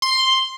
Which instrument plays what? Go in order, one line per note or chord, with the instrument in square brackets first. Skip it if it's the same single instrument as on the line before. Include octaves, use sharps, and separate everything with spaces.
[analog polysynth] C6